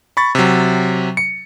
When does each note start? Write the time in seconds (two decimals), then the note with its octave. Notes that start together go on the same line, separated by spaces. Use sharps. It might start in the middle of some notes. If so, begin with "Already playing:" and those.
0.17 B5 C#6 A6
0.35 C3 F#3
1.17 C#7